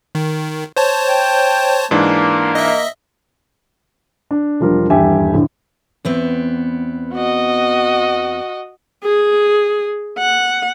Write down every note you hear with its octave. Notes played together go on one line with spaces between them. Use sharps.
D#3
C5 C#5 A5
G5
G#2 E3 A#3 D4
D#5 E5
D4
E1 F3 G3 D4 F4 A#4
D#1 E2 G2 G4 E5 G#5
A#1 A2 D3
E2 B3 C4
F#4 D#5
G#4
F#5